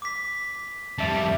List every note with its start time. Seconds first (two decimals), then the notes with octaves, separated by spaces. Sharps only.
0.02 D6 B6
0.98 F2 G3 E5 A5